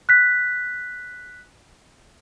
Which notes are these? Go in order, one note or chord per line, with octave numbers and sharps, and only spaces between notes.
F#6 B6